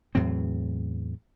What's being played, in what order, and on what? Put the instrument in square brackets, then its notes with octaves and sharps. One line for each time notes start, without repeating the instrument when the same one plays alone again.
[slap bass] E2 A2 F#3 C4